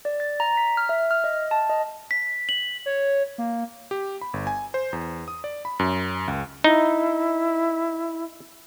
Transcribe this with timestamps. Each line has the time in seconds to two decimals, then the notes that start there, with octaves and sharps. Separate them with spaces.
0.05 D5
0.20 A6
0.40 A#5
0.57 B6
0.77 F6
0.89 E5
1.11 F6
1.24 D#5
1.51 A5
1.70 D#5
2.11 B6
2.49 F#7
2.86 C#5
3.38 A#3
3.91 G4
4.21 B5
4.34 G1
4.47 G#5
4.74 C5
4.93 E2
5.28 D#6
5.44 D5
5.65 B5
5.79 F#2
6.28 C#2
6.64 D#4 E4